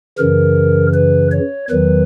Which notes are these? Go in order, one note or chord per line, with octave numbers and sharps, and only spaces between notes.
F#2 C#3 E3 A#4
B4
C#5
E2 D#3 F#3 B4